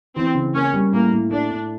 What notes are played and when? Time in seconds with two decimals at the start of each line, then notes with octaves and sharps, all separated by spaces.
0.15 E3 C4
0.35 C#3
0.55 A#3 C#4
0.74 G3
0.92 A2 A#3
1.12 A2
1.31 A3 D4
1.51 A2